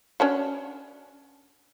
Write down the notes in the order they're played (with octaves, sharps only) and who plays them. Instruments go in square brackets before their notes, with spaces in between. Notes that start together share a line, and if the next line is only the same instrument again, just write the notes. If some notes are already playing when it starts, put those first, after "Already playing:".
[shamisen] C#4 D4 F#4